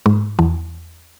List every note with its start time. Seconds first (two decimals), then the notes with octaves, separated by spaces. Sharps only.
0.06 G#2
0.39 E2